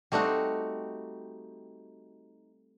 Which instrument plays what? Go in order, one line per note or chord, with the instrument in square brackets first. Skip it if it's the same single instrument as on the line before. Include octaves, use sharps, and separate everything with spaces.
[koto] G3 A3 C4 D#4 F#4